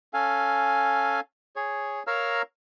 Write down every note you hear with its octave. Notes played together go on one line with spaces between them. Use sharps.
C#4 A4 F5 G#5
G#4 C#5
A#4 C#5 F5 A#5 E6 F6